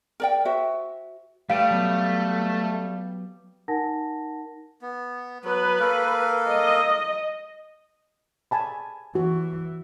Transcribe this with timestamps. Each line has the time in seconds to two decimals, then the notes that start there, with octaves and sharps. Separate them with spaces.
0.20 A#4 D5 G5
0.45 F#4 C5 E5
1.50 G3 A3 B4 F5 G5
1.71 F#3 B3
3.68 D#4 A#4 F#5 A5 A#6
4.82 B3
5.45 F#3 B3 B4
5.80 A#3 A4 A#4
6.49 D#5
8.51 G#5 A5 B5
9.15 E3 F#4